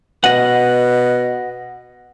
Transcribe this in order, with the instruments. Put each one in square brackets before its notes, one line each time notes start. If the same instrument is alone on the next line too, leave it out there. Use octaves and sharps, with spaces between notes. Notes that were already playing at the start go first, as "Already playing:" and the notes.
[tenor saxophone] B2 [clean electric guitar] D#5 F#5